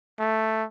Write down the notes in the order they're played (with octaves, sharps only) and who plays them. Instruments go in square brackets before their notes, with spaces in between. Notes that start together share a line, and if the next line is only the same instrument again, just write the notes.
[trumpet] A3